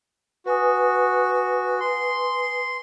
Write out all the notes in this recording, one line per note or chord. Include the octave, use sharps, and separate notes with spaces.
F#4 B4 G#5 D#6
C6